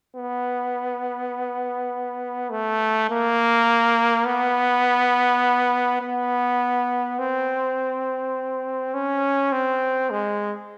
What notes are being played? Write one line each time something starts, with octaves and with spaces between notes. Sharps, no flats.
B3
A3
A#3
B3
B3
C4
C#4
C4
G#3